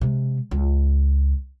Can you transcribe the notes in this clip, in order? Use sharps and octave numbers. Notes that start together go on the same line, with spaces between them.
C3 G#3
C#2